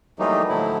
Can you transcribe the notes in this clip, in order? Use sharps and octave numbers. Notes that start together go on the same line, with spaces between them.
E3 F#3 G3 A3 A#3 D#4
A2 D3 F3 F#3 E4